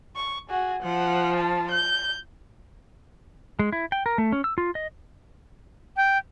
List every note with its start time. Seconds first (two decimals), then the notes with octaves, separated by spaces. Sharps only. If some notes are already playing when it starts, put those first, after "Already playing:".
0.16 C#6
0.50 F#4 G#4
0.83 F3 F#5
1.36 A5
1.71 G6
3.59 G#3
3.73 E4
3.92 G5
4.06 A#4
4.18 A3
4.32 C#4
4.44 E6
4.58 F4
4.75 D#5
5.97 G5